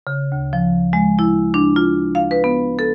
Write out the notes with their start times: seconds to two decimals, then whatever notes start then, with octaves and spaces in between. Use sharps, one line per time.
0.07 C#3
0.32 D2
0.53 F3
0.93 G#3
1.19 E4
1.54 D4
1.76 F4
2.15 F5
2.31 B4
2.44 B3
2.79 A4